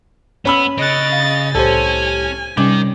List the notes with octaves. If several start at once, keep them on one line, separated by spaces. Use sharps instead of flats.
B3 C#4 B5 E6
C#3 D#5 F#6 A6 C#7 D7
F5
C2 A2 C#4 G4 A4 C5 G#5
C3 D#3 G3 C#4 D6